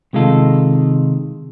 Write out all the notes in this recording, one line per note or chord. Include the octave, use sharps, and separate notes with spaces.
C3 D#3 G#3 D#4 F4 A4